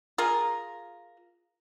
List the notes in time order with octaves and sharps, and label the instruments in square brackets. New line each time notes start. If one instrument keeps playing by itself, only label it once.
[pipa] F4 G#4 A#4